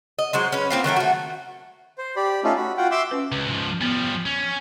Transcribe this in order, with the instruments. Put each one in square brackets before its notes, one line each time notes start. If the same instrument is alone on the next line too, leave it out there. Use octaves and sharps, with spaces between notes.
[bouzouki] D#5
F#3 G#3 C5
C#4 B4
A#3 C4 F4
D#3 F#3 A3 A#4
A3 F#4
[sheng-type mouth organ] C5
G4 D5 B5
A3 C#4 D#4 F4 A4
F#4 B5
F4 F#4 F#5 G5
E5 C6 D6 E6
[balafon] C#4 B4
[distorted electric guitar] C#2
G#2 F3
[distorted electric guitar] F3 G3 [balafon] B3
[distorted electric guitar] C#4